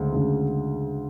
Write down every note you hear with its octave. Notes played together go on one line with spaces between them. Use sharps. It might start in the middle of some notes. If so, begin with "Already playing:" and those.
Already playing: D2 C#3 G#3
D2 C#3 G#3